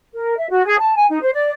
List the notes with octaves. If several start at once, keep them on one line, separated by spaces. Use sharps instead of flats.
A#4
E5
F#4
G#4
A5
G#5
D#4
C5
D5